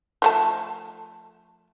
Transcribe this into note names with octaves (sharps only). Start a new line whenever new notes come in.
F3 A3 A5